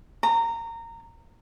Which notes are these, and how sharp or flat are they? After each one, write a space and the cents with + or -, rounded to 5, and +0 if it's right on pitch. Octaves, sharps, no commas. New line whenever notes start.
A#5 -20